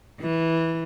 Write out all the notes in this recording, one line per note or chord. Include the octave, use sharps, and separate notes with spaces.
E3